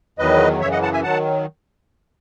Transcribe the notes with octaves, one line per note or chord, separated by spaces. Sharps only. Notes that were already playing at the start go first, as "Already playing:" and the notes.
E2 D#3 F#3 B4 D#5
F#2 C#3 E3 C#5 E5
D#5 F#5
F#5 A5
E5 G#5
D#3 F#3 F#5 A5